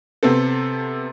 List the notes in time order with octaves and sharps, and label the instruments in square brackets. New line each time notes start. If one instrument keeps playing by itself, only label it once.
[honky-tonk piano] C3 B3 C4 A4